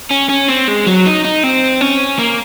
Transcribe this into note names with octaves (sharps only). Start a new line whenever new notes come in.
C#4
C#4
C4
G#3
F#3
D#4
D#4
C4
C#4
A#3